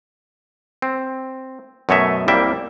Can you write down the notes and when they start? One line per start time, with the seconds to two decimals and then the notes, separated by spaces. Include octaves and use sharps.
0.82 C4
1.89 F#2 B2 A3 C#5 D#5 E5
2.28 C2 G3 A#3 E5 G5